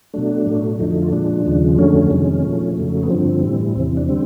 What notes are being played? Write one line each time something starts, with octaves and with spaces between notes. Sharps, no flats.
B2 F#3 A3 D4
A2 F#3 A3
F2 D3 F3 A3 D#4
D#4
F4
A#2 F3 G#3 D4
D#2 C#3 F3 G#3
F2 D3 F#3 A3 C#4
F2 C3 D#3 G#3
A#2 F3 A3
F2 C#3 F#3 A3
B3
G2 D3 F3 C4
A2 E3 G3
E2 C3 E3 C4
D4
D3 G3 C4